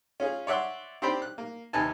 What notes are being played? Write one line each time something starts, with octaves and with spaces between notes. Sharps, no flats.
C#4 F4 G#4
C#5 D5 E5 F#5 C6
C4 D4 G4 C5 G5 B5
F#6
A#3
D#2 C3 D#4 B4 G#5 A5